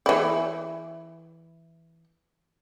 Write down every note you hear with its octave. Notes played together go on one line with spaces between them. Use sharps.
E3 E4